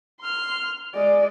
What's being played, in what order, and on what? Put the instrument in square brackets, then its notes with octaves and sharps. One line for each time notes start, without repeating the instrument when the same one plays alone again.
[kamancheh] C6 F6
[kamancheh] G#3 [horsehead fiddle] D5